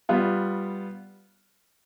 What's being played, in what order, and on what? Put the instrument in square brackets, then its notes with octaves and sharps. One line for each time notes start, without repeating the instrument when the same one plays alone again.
[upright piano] G3 B3 F4